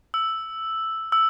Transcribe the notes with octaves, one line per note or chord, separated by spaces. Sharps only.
E6
E6